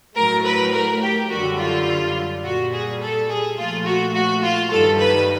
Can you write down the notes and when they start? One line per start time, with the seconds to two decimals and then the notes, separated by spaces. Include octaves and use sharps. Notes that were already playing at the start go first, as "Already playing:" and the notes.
0.16 A2 F#3 A3 A#4
0.45 B4
0.73 A#4
1.02 G4
1.30 F#2 D3 G3 F#4
1.58 F4
2.43 A#2 G3 F#4
2.72 G#4
3.00 A4
3.29 G#4
3.57 A#2 F3 A3 F4
3.85 F#4
4.14 F#4
4.42 F4
4.70 G2 D#3 G3 A4
4.99 B4